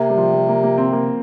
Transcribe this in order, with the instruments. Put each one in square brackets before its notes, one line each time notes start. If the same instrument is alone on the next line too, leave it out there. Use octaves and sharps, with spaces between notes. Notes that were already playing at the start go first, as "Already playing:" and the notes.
Already playing: [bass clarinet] C3 [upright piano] A#3
[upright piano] G3
F3
G3
A#3
A#3
C4
A#3